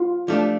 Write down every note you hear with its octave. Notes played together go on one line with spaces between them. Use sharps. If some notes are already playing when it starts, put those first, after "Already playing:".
Already playing: F4
F3 A3 D4 G4